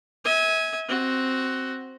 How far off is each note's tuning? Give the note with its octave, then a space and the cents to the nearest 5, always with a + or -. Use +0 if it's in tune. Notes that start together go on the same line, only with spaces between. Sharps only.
E5 -35 G#5 +0
C4 +0 F#4 +10